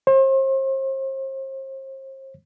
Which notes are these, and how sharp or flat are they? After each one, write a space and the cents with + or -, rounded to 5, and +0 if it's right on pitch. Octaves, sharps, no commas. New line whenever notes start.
C5 +40